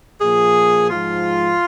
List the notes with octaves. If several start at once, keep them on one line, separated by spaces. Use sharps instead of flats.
A#2 F3 G#4
G#2 F3 F4